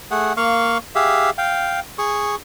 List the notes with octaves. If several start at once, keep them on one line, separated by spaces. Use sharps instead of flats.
A3 G#4 F#5
A#3 F5 C#6
G4 G#4 E5 F5
F5 G5
G#4 C#6